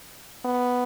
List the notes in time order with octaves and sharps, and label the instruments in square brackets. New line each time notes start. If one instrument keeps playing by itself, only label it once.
[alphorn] B3